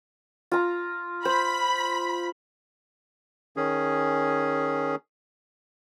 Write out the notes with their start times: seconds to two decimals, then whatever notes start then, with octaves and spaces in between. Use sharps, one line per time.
0.52 F4 A#5
1.25 C5 B5
3.57 D#3 C#4 G#4